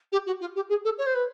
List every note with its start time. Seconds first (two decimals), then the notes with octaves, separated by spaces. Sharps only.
0.12 G4
0.26 F#4
0.40 F4
0.55 G4
0.69 G#4
0.84 A4
0.98 C#5
1.06 C5
1.14 B4